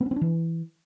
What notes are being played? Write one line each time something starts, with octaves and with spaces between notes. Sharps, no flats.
B3
C#4
C4
D4
E3